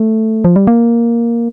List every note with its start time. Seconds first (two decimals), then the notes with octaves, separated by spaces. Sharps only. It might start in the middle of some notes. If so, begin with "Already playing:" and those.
Already playing: A3
0.44 F3
0.56 G3
0.67 A#3